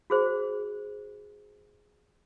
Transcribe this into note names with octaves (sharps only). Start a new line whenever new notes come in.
F#4 G#4 C5